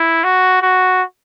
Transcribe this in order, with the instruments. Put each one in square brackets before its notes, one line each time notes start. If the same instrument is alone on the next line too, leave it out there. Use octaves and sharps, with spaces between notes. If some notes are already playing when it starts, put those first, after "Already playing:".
Already playing: [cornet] E4
F#4
F#4